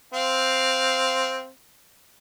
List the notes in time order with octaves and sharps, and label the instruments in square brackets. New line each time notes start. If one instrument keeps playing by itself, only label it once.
[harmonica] C4 F5